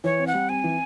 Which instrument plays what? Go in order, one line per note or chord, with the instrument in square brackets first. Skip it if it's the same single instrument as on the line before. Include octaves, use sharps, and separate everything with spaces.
[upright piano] E3 [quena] C#5
[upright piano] C4
[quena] F#5
[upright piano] G3
[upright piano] C4 [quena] G#5
[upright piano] E3